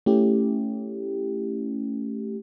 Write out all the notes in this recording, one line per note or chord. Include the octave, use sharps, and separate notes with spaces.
A3 C#4 E4 G4